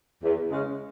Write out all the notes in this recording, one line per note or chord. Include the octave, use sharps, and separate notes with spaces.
E2
C#3 G#3 C#4